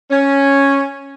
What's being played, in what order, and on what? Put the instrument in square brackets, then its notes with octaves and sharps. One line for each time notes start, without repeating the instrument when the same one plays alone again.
[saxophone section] C#4